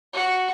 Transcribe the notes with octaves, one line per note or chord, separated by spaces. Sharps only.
F#4